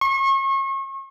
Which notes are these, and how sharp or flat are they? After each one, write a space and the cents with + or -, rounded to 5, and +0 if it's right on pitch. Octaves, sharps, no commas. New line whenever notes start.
C#6 -35